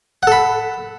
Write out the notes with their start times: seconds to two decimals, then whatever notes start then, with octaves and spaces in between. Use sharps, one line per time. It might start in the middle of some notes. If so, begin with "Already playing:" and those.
0.23 F#5
0.27 A4
0.32 B5